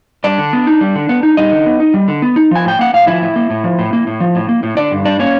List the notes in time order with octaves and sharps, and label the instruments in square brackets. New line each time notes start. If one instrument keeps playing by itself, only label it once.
[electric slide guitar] G3 D4 D5
D3
B3
D#4
G3
D3
B3
D#4
G3 D#4 D#5
D3
B3
D#4
G3
D3
B3
D#4
F3 G#5
A2 G5
A#3 F#5
A2 F5
F3 E4 E5
A2
A#3
A2
F3
A2
A#3
A2
F3
A2
A#3
A2
D3 D4 D5
G2
G3 D4 D5
A#3 C#4 C#5